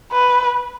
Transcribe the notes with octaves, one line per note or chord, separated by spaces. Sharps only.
B4